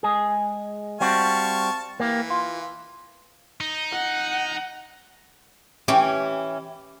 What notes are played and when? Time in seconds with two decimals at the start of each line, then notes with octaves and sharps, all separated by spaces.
0.03 G#3 G#4
1.01 G3 C4 F#4 F5 A5 C#6
2.00 E3 A#3 G4
2.30 F4
3.61 D#4
3.92 F#5
5.88 E3 C#4 G4